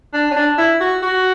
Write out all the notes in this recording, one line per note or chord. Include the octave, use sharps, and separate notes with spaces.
D4
C#4
D4
E4
F#4
F#4